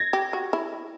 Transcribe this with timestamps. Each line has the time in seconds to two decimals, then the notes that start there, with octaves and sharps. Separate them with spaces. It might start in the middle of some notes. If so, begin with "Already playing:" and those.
Already playing: G#6 A#6
0.13 G4
0.33 F#4
0.53 E4